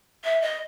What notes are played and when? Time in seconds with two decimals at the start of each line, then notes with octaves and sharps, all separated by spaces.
0.24 E5
0.42 D#5